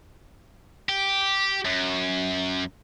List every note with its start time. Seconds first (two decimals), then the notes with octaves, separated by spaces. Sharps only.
0.89 G4
1.65 F#2